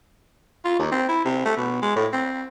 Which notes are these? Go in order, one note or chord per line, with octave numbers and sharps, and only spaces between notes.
F4
D#2
C4
E4
C3
A3
B2
G#3
A2
C4